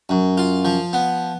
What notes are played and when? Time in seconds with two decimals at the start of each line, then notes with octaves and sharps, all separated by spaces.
0.09 F#2
0.38 F4
0.65 F3
0.93 B3